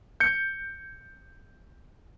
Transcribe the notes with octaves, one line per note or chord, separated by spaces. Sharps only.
G6 C#7